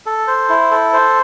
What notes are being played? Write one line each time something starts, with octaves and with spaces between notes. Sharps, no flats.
A4
C5
E4
A4
C5